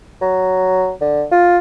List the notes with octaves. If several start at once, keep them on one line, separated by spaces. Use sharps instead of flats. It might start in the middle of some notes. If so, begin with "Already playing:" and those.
F#3
D3
F4